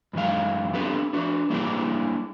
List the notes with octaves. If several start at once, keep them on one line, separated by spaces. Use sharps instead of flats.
F#2 D#3 G#3 F5
B3 C4 D4 G4 A4 B4
D4 F#4 B4
G3 A#3 D4 E4 G4 G#4